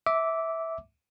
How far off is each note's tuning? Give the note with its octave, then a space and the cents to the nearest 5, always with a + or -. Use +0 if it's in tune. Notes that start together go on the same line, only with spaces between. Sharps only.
E5 -15 D6 -10